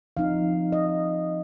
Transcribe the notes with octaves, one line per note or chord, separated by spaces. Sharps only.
F3 C4 D#4 F5
D#5